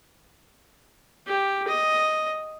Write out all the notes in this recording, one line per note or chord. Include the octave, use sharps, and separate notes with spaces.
G4
D#5